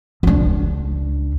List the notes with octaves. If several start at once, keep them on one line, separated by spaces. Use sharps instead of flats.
C#2 D4